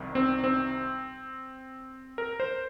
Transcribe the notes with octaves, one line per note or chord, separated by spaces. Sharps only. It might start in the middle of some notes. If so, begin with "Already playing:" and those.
Already playing: C2 C3 D#3 G3
C4
C4
A#4
C5